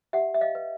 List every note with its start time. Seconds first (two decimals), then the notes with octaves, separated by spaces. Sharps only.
0.13 G4 E5 F#5
0.34 E5
0.41 D#5 F5
0.55 B4